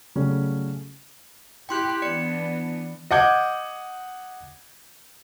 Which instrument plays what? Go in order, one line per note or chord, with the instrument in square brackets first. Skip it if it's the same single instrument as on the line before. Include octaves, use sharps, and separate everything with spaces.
[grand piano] C#3 F#3 G3 A3 C#4
[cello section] E4 G4 [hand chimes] G5 C6 F#6
[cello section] E3 B3 D4 [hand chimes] D5 C#7
[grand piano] D#5 F#5 D6 G6 G#6